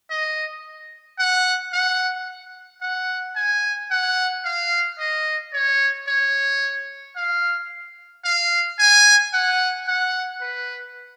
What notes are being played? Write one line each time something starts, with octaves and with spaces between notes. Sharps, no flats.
D#5
F#5
F#5
F#5
G#5
F#5
F5
D#5
C#5
C#5
F5
F5
G#5
F#5
F#5
B4